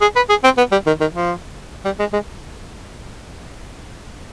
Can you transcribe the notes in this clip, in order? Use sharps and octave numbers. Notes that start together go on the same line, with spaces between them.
G#4
B4
G#4
C4
B3
G3
D#3
D#3
F3
G3
G#3
G#3